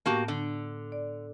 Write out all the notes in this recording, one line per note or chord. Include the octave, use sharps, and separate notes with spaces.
A2 A#3 B3 F#4 G4 A5
D3
D5